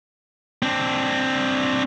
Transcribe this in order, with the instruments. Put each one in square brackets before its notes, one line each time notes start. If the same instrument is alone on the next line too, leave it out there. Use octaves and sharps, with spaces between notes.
[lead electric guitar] C4 D4